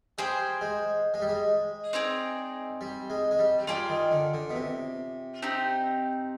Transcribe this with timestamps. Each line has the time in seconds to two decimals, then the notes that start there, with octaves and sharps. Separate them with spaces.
0.18 G3 G#4 C5 G5
0.61 G#3
1.14 G#3
1.22 G3
1.29 G#3
1.93 C4 D#4 G#4 D5
2.81 G3
3.10 G#3
3.31 G#3
3.39 G3
3.67 G3 F4 G#4 D5 G5
3.89 D#3
4.11 D3
4.33 D3
4.50 B2
4.55 C3
5.42 C4 D#4 G4